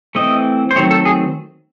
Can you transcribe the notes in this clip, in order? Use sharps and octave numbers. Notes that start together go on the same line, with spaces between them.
E3 A3 C4 D#5
C5
D#3 F#3 A3 C4 C#5
A4
G#4